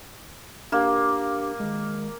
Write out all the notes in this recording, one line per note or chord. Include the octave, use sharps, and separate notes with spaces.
A#3 D4 G4
D#3 G#3